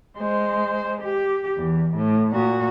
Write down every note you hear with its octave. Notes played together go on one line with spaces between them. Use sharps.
G#3 C5
G4
E2
A2
A#2 F#4